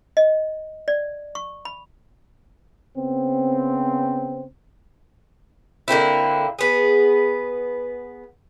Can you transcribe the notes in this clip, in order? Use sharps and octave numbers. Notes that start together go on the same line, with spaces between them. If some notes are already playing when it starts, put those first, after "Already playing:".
D#5
D5
C#6
B5
C#3 B3 C4
D3 A#3 C4 E4
B3 G#4